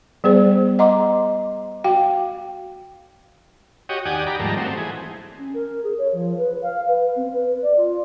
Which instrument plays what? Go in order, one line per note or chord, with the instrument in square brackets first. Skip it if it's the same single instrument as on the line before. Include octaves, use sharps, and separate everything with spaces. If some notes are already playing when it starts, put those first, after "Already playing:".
[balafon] G3 B3 G#4 C5
D#5 F#5 A#5 C6 D6
F#4 F5 G5
[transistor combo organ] F#4 G4 C#5 D#5
D#2 G4 D5 F#5 G#5 D#6
G4 D5 A#5 B5
G#2 D#3 F3 G3 A3 A#3
F#3 A3 C4
E3 G#4
[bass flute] C#4
A#4
G#4
C#5
F3
B4
F5
B4
C4
B4
D5
F4